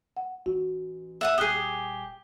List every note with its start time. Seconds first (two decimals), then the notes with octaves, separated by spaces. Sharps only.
0.17 F#5
0.46 A1 F#4
1.21 E5 F#5 D#6
1.38 D#1 G4 G#4 D#6 F#6 G6